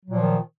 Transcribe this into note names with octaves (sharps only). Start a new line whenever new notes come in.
A#2 D#3 F3 F#3